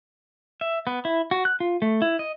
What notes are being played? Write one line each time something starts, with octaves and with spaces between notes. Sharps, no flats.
E5
B3
E4
F#4
F#6
F4
A3
E4
D#5